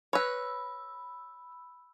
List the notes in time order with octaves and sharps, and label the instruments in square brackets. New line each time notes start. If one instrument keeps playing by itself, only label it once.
[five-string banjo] B4 C#5 [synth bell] B5 E6